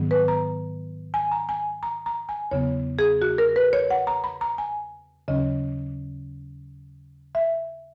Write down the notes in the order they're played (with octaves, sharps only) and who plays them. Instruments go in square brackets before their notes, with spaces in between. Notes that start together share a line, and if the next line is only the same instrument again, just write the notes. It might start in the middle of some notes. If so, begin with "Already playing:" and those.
Already playing: [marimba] G#2 D#3 F#3 B3
B4
A#5
G#5
A#5
G#5
A#5
A#5
G#5
E2 C#3 F#3 B3 C#5
G#4
F#4
A#4
B4
C#5
F#5
A#5
B5
A#5
G#5
D#2 C#3 F#3 C#4 D#5
E5